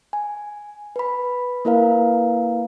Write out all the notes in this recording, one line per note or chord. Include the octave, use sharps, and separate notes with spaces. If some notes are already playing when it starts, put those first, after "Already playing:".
G#5
B4 B5
A#3 E4 A#4 B4 F5